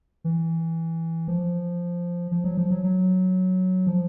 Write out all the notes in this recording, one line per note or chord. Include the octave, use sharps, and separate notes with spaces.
E3
F3
F3
F#3
F3
F#3
F#3
F3